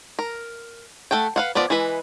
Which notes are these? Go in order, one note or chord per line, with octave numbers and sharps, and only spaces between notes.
A#4
A3 A4 F#5 G5
B4 F5 F#5
F3 B3 F4 D5
E3 G#3 E4 B4